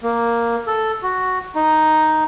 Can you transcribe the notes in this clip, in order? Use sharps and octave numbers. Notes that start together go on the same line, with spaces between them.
A#3
A4
F#4
D#4